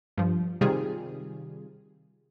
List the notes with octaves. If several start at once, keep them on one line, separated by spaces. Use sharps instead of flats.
G2 F3
C3 D#3 G3 F4 G#4